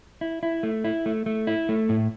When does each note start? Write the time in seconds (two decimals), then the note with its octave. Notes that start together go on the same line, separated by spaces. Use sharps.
0.21 E4
0.43 E4
0.63 A3
0.84 E4
1.06 A3
1.26 A3
1.47 E4
1.69 A3
1.89 A2